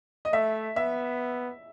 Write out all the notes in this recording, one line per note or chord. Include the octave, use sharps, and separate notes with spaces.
D#5
A3 E5
B3 E5